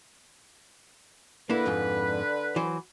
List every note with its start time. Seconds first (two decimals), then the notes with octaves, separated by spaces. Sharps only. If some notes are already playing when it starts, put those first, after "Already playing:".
1.50 D3 A#3 E4 B4
1.66 F2 G#2
2.56 E3 F#3 C5